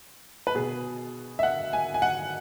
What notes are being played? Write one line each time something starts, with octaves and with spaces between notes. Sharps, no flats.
B4
B2 B3 G#4
E5
F#5
G#5
G#5
F#5